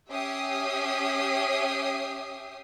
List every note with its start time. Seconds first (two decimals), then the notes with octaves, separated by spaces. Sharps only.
0.11 C#4 G4 E5 G5 D#6 C7